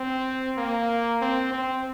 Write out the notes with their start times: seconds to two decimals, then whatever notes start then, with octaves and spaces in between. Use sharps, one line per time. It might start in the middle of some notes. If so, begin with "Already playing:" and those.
Already playing: C4
0.58 A#3
1.21 C4
1.53 C4